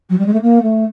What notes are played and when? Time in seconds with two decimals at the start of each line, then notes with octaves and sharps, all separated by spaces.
0.09 F#3
0.18 G3
0.26 G#3
0.33 A3
0.41 A#3
0.62 A3